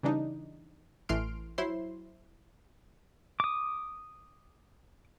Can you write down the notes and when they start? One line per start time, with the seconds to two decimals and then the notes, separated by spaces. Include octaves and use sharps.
0.03 C#3 E3 G3 D4 D#4
1.09 A1 E3 A3 C6 F6 D7
1.58 F#3 E4 C5 C6
3.40 D6 D#6